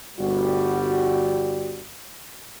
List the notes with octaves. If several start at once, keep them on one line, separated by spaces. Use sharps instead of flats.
G1 G3 F#4